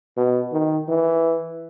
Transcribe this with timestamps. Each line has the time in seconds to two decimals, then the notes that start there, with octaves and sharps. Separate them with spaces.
0.17 B2
0.52 D#3
0.88 E3